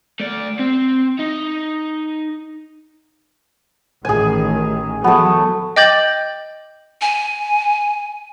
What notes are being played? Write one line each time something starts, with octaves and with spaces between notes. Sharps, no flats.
A3 D5
C4
D#4
A1 A2 D#3 G#4 G#5
E3 F#3 A3 B3
D#5 G5 D6 G6 A6 F#7
G#5